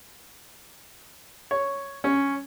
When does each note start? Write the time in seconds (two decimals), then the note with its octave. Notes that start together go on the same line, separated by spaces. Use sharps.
1.51 C#5
2.04 C#4